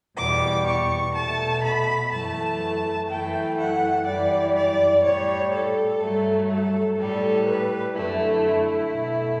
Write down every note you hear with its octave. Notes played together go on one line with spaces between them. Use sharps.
E2 B2 G3 D6
C#6
B2 A3 A5
B5
F#2 E3 A3 A5
F#2 E3 A3 G5
F#5
F#2 E3 G3 D5
D5
A2 G3 C#5
A4
G2 F#3 A3
A4
A2 G3 A4
B4
F#2 D3 A3 E4
E4
B2 A3